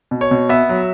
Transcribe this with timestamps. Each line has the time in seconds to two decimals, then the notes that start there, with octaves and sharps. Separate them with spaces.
0.11 B2
0.21 C#5
0.31 B2
0.49 B3 E5
0.69 F#3